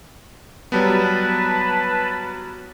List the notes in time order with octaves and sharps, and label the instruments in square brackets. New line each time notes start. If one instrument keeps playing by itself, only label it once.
[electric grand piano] F#3 G3 B3 [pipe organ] B4 A5 B5